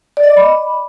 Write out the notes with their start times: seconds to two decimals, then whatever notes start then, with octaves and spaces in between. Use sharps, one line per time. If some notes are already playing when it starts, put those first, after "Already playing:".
0.17 D5
0.23 D#5
0.30 D6
0.37 B5